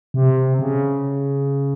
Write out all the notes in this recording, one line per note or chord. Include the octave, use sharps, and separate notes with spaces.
C3
C#3